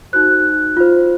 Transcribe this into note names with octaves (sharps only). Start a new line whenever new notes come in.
D#4 F#4 C5 F#6
F4 C5